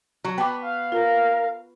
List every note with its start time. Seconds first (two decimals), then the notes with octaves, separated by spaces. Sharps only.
0.24 F#3
0.38 B3 G5 A5 B5 D6
0.62 F5
0.92 F4 A#4